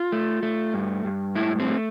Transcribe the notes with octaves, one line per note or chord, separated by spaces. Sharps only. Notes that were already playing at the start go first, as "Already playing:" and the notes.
Already playing: F4
A3
A3
G2
G2
A2 E4
C4
A3